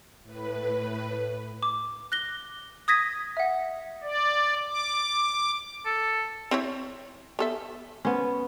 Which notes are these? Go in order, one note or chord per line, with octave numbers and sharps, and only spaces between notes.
A2 B4
D6
F#6 A#6 G7
D#6 G#6 A#6 B6 D#7
E5 F#5
D5
D6
A4
C4 E4 C#5
B3 A4 E5
B3 C#4 C5